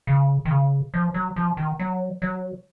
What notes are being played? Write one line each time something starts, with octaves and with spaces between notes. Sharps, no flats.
C#3
D#3
C#3
F3
F#3
F3
D#3
F#3
F#3